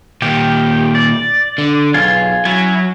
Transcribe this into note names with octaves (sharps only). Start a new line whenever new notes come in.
A#2 D#3 G4
D5
D3
B1 F4 G#4
F#3 C#4 E4 G#5